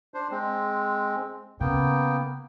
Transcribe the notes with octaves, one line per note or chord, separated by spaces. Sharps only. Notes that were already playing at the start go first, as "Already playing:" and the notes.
D4 C5
G#3 C4
C#3 A#3 B3 G5